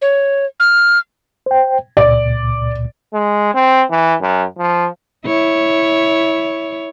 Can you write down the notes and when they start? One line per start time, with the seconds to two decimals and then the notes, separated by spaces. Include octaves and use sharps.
0.01 C#5
0.60 F6
1.46 C5 G5
1.97 C#2 A#2 D5
3.13 G#3
3.54 C4
3.91 E3
4.21 F#2
4.58 F3
5.26 E4 C#5